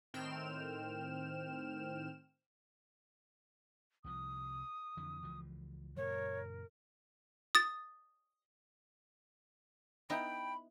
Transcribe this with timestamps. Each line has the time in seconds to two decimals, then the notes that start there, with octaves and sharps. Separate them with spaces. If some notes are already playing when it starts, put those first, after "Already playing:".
0.14 A2 D#3 C4 G5 F6 E7
4.04 C2 C3 F3 D#6
4.97 F2 D3 E3
5.23 C#2 E3 F3
5.97 F#2 A#2 C#3 A#4 C#5
7.55 D#6 A6
10.10 B3 D#4 E4 G5 B5